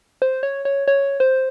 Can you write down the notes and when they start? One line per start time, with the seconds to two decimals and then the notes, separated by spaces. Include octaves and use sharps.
0.22 C5
0.43 C#5
0.65 C#5
0.88 C#5
1.20 C5